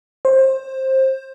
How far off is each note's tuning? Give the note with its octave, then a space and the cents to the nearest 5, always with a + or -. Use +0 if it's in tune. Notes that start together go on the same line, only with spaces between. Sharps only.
C5 +20